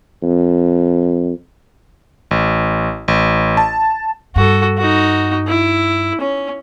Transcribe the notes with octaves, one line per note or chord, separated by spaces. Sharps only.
F2
A1
A1
A5
G2 F#4 A4
D#4 F#4
E4
C#4